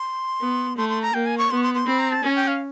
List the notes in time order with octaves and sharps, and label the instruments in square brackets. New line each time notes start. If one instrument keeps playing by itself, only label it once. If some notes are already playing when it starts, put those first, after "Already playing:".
Already playing: [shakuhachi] C6
[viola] B3
[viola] A3 [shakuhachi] C6
[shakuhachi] C6
A#5
[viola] A#3 [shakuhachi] G5
[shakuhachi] G#5
C#6
[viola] B3 [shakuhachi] C6
[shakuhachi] C#6
C6
C6
[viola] C4 [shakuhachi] B5
[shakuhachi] A#5
A5
[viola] C#4 [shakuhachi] G#5
[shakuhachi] G5
F5